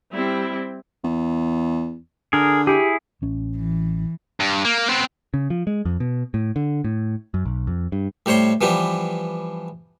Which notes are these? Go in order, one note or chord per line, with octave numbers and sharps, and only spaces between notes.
G3 C4 E4
E2
D3 G#4 A#4
E4 G4 G#4
A1 C#4
E3
G2
A#3
B3 C4
C#3
F3
G#3
F2
B2
A2
D3
A2
F#2
B1
F2
G2
A2 G3 C5 C#5 C6
E3 F3 G3 B3 G4